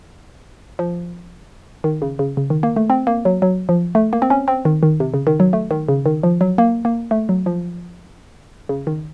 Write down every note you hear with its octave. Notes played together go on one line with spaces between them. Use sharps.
F3
D#3
C#3
C#3
C#3
D#3
A#3
A3
C4
A#3
F#3
F#3
F3
A3
A#3
C4
C#4
C4
D#3
D#3
C3
C#3
D#3
F#3
A3
D#3
C#3
D#3
F3
F#3
A#3
A#3
A3
F#3
F3
C#3
D#3